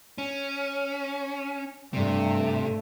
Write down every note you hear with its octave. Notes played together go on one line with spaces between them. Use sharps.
C#4
G2 C3 A3